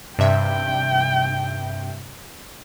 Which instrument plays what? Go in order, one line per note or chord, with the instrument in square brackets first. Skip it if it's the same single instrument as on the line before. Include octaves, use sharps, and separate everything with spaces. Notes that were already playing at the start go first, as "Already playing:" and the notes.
[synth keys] G2 C3 E5 [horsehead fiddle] G5